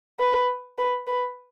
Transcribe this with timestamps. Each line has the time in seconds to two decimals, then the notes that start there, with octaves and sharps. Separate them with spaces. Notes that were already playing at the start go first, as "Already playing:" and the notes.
0.20 B4
0.78 B4
1.07 B4